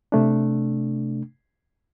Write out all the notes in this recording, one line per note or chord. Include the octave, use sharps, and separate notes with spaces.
C3 A3 D4